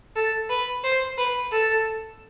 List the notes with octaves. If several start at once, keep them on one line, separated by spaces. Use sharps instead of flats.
A4
B4
C5
B4
A4